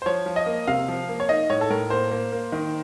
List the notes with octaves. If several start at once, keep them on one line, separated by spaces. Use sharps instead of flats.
C5
F3 C#5
F3
D#5
A#3
C3 F5
F3
A#3
C#5
D#4 D#5
A2 C#5
A4
A2 A#4
A#3 C5
A#3
A#3
D#3